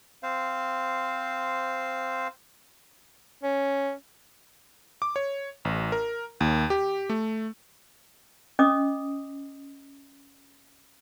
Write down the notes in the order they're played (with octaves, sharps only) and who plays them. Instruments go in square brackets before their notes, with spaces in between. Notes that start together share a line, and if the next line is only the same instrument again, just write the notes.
[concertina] C4 C5 F5
[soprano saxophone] C#4
[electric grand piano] D6
C#5
A1
A#4
D#2
G4
A3
[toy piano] C#4 D#5 D6 D#6